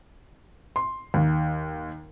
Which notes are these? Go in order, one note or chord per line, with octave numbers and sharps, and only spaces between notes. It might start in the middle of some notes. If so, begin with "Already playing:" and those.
C6
D#2